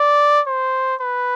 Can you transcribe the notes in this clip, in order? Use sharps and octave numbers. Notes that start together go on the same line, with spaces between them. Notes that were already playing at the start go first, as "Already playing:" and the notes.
Already playing: D5
C5
B4